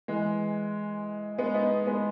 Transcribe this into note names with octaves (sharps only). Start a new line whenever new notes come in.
E3 G#3
G#3 B3
B3 D#4
G#3 B3